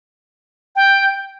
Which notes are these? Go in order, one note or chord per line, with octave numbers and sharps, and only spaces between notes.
G5